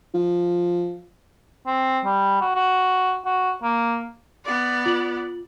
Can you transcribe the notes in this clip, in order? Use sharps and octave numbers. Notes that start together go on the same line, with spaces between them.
F3
C4
G3
F#4
F#4
F#4
A#3
B3 D5
F4 F#7